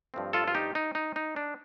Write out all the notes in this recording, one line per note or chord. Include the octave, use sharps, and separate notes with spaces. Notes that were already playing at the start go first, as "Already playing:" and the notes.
G2 F3 A3 C4
F4 A4
F4
D#4 G4
D#4
D#4
D#4
D4